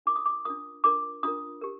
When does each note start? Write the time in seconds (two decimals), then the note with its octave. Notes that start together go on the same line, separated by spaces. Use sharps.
0.06 D4 F4 A#4 D6
0.16 D#6
0.26 D6
0.45 D4 F4 A#4 D#6
0.84 D4 F4 A#4 D6
1.23 D4 F4 A#4 D#6
1.62 G4 A#4